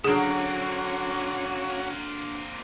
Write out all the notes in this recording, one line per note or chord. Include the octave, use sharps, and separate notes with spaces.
D3 F#3 A#3 C4 C#4 F#4 G#4